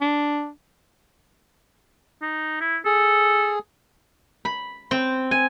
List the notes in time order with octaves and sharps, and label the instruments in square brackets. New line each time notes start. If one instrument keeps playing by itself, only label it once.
[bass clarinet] D4
[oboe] D#4
E4
[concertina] G#4 [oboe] A4
[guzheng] B5
C4
G#5